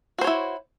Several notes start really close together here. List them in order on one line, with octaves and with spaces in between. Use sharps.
F#4 C5 C#5 E4